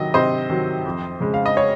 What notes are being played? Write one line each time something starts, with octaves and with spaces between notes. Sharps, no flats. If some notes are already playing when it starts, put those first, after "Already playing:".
Already playing: C3 D#3 F#3 D#5
C3 C5 D#5
D#3 F#3
F2
C#3 G#3
F5
D#5
C#5